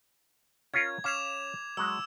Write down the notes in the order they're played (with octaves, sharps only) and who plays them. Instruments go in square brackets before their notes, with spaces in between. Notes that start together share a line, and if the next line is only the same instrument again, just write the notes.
[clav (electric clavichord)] C#4 F4 A#4 [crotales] G#6
[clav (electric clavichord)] C#4 F5 [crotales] D6 E7 F7
[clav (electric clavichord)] F#3 G#3 [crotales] E6